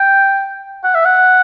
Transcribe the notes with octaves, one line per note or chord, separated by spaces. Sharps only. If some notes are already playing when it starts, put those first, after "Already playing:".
Already playing: G5
F#5
E5
F#5